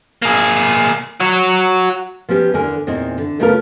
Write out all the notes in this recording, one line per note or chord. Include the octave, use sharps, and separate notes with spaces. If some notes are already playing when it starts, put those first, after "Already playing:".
A#3 G#4
F#4 C#5
F3 B3 C#4 G4
E2 D3 A#4 G#5
E2 A#2 C4 D#4
D3
C#3 A3 B3 C#4 F4 A#4